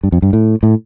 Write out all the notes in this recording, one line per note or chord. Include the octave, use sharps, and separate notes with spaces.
G2
F2
G2
A2
A2